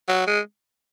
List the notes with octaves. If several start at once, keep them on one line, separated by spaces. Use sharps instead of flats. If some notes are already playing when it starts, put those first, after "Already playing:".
F#3
G#3